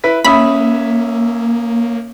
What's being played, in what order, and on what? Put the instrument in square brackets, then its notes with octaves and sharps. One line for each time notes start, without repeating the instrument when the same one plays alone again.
[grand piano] E4 B4 B6
[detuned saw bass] A#3 [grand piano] C#4 E5 D#6 [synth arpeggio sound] B5